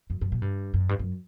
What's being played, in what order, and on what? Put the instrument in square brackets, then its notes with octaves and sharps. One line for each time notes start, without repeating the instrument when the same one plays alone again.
[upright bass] F#2
F#2
A#2
G2
F#2
G2
F#2